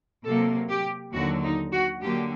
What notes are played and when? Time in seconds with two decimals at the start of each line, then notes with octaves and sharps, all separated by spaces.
0.25 C3 F#3 A#3 A4
0.69 G4
1.13 D#2 D3 F#3 F#4
1.43 D#4
1.72 F#4
2.02 D3 F#3 A#3 G4